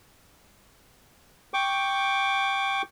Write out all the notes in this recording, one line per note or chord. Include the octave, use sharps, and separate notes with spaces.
G5 C#6 D6